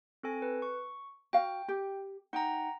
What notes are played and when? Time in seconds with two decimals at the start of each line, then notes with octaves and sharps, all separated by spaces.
0.23 C4 A4 G#5
0.42 B4
0.62 C#6
1.33 F#4 F5 G5
1.68 G4
2.33 D#4 F#5 G5 A#5